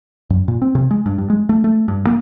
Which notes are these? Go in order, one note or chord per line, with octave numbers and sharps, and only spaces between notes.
F#2
A#2
C4
C3
G#3
G2
G2
G#3
A3
A3
G2
A#3